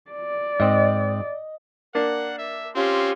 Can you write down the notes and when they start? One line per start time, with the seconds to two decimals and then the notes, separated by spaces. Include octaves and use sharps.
0.12 D5
0.60 G#2 C4 D#5
1.95 A#3 D4 A#4 F#5
2.38 E5
2.75 C4 C#4 F4 G4 C6